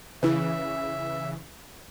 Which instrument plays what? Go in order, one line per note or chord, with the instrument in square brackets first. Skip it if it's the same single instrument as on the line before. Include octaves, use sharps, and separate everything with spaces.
[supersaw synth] C#3 E3 [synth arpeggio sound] E4 B4 [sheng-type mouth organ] E5